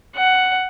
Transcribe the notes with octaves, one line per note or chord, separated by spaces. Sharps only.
F#5